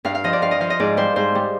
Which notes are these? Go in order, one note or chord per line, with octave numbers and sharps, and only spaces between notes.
G2 F5
F5
F3 D#5
D5
G2 F5
D#5
F3 F5
D#5
G#2 D5
G3 C5
G#2 C5
G3